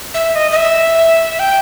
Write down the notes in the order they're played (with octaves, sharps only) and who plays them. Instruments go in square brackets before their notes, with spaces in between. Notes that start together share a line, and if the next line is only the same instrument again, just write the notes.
[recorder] E5
D#5
D#5
E5
G5